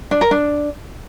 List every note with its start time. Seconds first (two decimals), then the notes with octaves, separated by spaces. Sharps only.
0.11 D4
0.21 A#4
0.31 D4